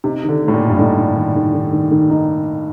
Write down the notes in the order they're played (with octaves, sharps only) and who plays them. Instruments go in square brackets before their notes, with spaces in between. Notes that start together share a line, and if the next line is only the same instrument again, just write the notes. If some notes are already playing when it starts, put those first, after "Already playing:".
[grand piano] C3 [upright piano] D#4
[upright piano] D#3
[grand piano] D3
[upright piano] A3
[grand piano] A2
A#2
[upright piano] D#4
[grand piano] G2
[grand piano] A2 [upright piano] D#4
[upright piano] D#4
D#3
D#3
D#3
D#3
D#3
D#4